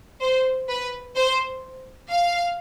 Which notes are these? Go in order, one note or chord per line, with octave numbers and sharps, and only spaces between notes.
C5
B4
C5
F5